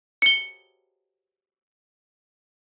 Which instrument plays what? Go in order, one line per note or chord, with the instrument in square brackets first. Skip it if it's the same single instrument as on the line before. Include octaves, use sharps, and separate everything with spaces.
[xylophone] C#7 G7